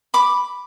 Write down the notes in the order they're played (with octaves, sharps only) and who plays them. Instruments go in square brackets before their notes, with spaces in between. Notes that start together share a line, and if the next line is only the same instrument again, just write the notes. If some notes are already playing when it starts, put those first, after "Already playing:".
[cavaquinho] B5 D6